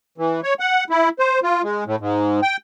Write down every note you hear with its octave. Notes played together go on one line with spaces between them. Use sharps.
E3
C#5
F#5
E4
C5
F4
G#3
A2
G#2
G5